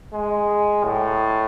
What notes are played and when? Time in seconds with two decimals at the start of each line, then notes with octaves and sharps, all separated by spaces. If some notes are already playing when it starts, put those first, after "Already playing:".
0.13 G#3
0.85 A2